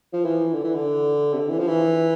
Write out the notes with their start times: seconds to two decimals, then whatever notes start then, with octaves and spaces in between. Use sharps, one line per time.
0.13 F3
0.25 E3
0.53 D3
0.64 E3
0.75 D3
1.33 C3
1.39 D3
1.49 E3
1.58 F3
1.68 E3